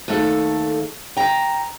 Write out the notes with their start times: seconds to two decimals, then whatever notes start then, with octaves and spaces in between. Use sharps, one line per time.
0.08 D#2 A3 A4
1.17 G5 A#5